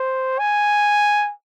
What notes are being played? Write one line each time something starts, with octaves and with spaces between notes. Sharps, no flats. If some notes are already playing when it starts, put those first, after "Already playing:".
Already playing: C5
G#5